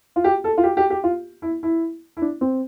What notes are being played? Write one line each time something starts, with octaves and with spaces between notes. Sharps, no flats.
F4
G4
A4
F4
G4
G4
G4
F4
E4
E4
E4
D4
C4